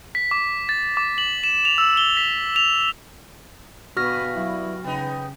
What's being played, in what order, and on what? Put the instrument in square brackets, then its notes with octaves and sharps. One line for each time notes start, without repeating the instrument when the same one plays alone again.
[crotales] B6
D6
A6
D6
F#7
E7
F7
E6
G7
B6
F7
[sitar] G2 [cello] B2 B4 [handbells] F#4 F6 A#6
[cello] F#3 [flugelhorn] E4
[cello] C#3 [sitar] B3 D#4 [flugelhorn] G5